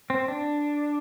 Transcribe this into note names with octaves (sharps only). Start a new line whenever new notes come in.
C4
D4